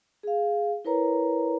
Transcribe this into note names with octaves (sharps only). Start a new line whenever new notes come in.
G#4 F5
E4 A#4 B4 C#5 A#5